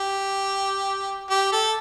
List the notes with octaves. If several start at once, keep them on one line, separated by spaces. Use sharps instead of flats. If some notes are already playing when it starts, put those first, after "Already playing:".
Already playing: G4
G4
A4